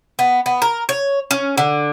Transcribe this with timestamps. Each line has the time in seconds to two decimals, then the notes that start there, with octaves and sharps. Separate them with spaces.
0.19 B3
0.46 B3
0.62 A#4
0.89 C#5
1.31 C#4
1.58 D3